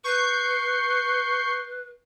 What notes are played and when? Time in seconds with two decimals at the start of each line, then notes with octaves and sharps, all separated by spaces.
0.04 B4 C#6 G6 C7